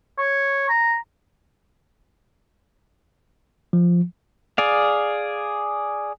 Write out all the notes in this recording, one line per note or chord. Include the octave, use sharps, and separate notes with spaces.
C#5
A#5
F3
G#4 D5 F5